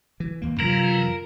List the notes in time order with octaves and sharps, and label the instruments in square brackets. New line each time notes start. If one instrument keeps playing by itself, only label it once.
[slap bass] E3
D#2 A#3
[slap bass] F#2 [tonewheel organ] C3 E3 F#3 [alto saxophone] F4 [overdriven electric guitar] A#4